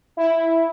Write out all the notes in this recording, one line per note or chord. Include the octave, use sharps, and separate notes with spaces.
E4